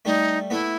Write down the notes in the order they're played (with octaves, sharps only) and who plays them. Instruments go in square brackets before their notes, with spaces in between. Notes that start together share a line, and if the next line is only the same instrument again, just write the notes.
[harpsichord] G3 A3 [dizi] D#4
[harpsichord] A3 B3 [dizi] E4